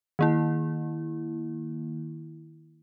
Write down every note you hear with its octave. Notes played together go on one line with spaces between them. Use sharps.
D#3 A#3 E4